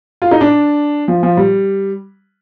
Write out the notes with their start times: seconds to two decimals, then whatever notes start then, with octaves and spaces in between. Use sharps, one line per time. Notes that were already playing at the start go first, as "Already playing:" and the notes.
0.22 F4
0.31 D#4
0.41 D4
1.08 F3
1.23 F3
1.37 G3